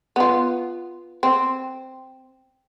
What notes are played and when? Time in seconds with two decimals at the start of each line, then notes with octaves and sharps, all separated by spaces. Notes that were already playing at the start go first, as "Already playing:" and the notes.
0.16 B3 F4
1.23 C4